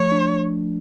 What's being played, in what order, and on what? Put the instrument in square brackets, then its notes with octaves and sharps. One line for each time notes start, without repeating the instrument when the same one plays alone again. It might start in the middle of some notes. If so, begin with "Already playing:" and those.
Already playing: [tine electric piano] F3 A3 [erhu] C#5
[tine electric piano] D4